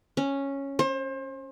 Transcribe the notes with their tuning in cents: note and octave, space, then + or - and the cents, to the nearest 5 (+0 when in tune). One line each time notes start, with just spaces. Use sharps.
C#4 -5
C5 +35